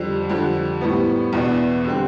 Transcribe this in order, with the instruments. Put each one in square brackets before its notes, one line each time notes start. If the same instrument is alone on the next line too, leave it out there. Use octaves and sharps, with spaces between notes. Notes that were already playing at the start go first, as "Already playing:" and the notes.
Already playing: [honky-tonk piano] F2 D3 G3
F2 D3 G3
A2 G3 B3
E2 B2 B3 D4
D3 G3 C4